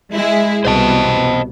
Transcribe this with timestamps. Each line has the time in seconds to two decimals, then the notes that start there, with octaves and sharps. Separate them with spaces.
0.14 G#3 E4 G#4
0.65 C2 B2 C5 D#5 A5